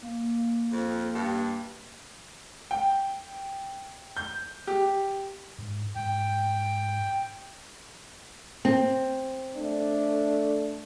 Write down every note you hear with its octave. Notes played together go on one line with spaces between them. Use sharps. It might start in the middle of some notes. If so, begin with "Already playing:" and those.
A#3
F2
G2
G5
G6
G4
G#2
G#2 G5
C4
A3 D4